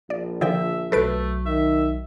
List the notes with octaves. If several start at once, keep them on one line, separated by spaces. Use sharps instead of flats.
A#1 D5
D3 F3 E5 G5
B1 F#3 A3 A4 B4 D7
D#3 E5